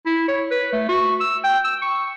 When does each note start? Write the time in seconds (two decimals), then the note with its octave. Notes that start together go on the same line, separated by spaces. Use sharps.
0.06 E4
0.28 C#5
0.51 B4
0.72 A3
0.88 F#4
1.20 E6
1.44 G5
1.64 E6
1.82 C#6